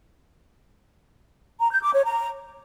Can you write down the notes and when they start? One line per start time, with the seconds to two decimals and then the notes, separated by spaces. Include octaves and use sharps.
1.59 A#5
1.71 G6
1.82 D6
1.94 C#5
2.05 A#5